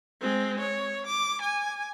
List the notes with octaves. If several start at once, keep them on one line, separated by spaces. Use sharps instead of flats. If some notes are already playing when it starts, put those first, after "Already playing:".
G#3 C4
C#5
D6
G#5